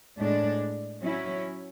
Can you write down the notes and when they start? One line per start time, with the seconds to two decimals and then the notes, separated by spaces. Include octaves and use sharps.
0.18 A2 G#3 D4
1.03 F#3 C#4 E4